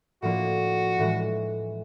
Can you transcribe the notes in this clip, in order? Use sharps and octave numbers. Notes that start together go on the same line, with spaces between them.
A2 F3 A#3 D4 F#4
A2 E3 G#3